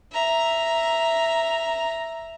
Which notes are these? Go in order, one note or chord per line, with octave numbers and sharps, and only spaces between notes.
E5 A#5